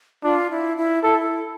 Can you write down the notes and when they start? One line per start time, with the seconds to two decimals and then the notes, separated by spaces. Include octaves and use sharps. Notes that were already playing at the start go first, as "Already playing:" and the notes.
0.23 D4 F4
0.51 E4
0.77 E4
1.03 E4 A4